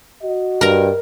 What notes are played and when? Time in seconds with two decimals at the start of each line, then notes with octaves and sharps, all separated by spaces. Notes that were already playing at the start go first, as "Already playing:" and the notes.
0.22 F#4 D#5
0.61 G2 A#4 A#5